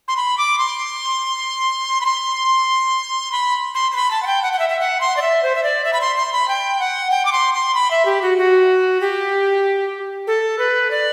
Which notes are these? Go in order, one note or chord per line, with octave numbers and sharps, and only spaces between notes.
C6
B5
D6
C6
B5
C6
B5
C6
C6
B5
A5
F#5
G5
F#5
F#5
E5
E5
F#5
C6
D5
E5
C5
E5
D5
E5
B5
C6
C6
B5
G5
F#5
G5
D6
C6
C6
B5
E5
G4
F#4
F#4
G4
A4
B4
D5